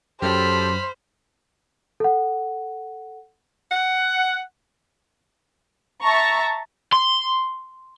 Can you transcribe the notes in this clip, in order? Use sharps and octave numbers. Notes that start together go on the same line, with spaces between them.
F#2 F#3 G4 A4 C5 B5 F6
A4 F#5
F#5
E5 A5 A#5 C#6
C6